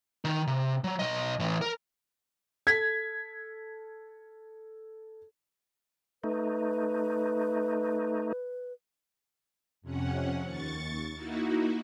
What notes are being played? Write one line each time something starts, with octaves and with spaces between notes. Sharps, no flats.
D#3 D#4
C3
F#3
B1 D#5
A2 E3
A#4
A4 G#6 B6
A3 D#4 B4
F2 C3 C#4 F#5
D#2 C#6 A6
A#3 D#4 E4 F#4